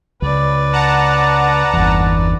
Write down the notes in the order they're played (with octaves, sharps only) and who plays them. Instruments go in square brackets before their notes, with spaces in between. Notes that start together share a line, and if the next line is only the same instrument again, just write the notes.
[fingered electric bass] C#2 [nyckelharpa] B4 D5
[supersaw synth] F#5 A5 A#5
[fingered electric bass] G1 E2